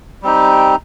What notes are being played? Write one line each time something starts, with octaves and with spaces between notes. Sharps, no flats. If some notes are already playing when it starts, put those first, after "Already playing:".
G3 C4 D#4 G4